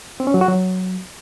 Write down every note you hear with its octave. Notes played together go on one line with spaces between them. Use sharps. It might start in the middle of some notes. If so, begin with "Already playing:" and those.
C4
C#4
F#3
F#4
F#3